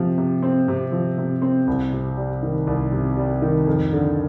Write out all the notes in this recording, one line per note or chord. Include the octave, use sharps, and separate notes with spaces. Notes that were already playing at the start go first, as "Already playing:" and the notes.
Already playing: C3 F3
C3
C4
C3
F3
C3
C4
C2
C3
G3
D#3
C2
C3
G3
D#3
F2
D3